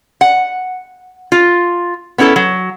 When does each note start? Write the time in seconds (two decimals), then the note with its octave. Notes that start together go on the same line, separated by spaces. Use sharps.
0.21 F#5
1.32 F4
2.18 B3 C#4 E4 G#4 A4
2.36 F#3